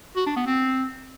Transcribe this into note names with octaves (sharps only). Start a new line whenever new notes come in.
F#4
D4
B3
C4